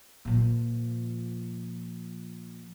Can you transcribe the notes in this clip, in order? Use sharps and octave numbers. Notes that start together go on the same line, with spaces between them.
A#2 F3